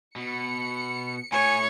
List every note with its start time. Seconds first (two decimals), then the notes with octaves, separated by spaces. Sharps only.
0.16 B2 C#7
1.32 A2 C#5 G#5 C#7